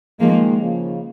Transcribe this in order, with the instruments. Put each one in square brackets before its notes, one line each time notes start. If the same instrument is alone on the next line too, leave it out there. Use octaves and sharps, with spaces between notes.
[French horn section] D#3 G#3 [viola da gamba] F3 A#3
[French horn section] C#3 F3